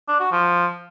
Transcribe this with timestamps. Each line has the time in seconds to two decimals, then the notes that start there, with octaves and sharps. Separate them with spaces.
0.08 D4
0.20 F#4
0.32 F3